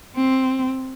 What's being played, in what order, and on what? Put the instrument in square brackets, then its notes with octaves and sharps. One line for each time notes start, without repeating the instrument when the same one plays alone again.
[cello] C4